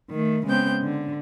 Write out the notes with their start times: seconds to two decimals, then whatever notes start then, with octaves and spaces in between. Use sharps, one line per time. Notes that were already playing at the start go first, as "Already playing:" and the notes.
0.11 D#3 A3
0.46 C#3 G#3 B3 C4 G6
0.82 D3